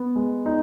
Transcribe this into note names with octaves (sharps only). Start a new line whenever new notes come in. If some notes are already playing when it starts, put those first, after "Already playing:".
Already playing: B3
G#3
D#4